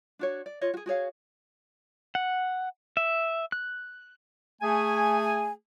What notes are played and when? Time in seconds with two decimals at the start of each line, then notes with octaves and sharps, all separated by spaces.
0.19 D4 F#4 C#5
0.46 D5
0.61 F4 C#5 D#5
0.74 F#4 G#4
0.86 F#4 G#4 C#5 F5
2.15 F#5
2.97 E5
3.52 F#6
4.62 A3 G#4 G#5